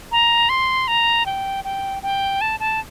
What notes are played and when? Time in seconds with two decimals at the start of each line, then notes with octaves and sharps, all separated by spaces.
0.12 A#5
0.49 C6
0.88 A#5
1.26 G5
1.64 G5
2.03 G5
2.41 A5
2.60 A5